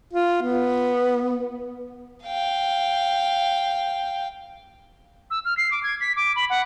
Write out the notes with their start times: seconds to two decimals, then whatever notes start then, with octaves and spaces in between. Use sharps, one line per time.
0.13 F4
0.43 B3
2.25 F5 G5
5.31 E6
5.45 F6
5.57 C7
5.71 D6
5.83 G#6
6.01 B6
6.16 D6
6.36 B5
6.50 F#5